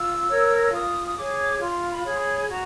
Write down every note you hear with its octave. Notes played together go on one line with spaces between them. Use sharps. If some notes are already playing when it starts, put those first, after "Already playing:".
Already playing: F4 E6
A#4 C#5
E6
F4 D#6
D#6
G#4 C#5 D6
F4 C6
B5
G#4 C#5
C6
B5
F#4 A#5